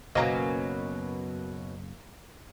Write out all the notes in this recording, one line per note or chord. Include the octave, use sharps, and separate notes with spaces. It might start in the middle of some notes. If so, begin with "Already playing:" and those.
F#1 B2 F#3 A#3 C#4 D#5 A#5